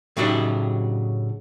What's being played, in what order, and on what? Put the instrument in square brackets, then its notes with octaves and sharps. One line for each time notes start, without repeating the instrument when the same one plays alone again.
[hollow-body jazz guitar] A2 C#3 F#3 D4 D#4 G4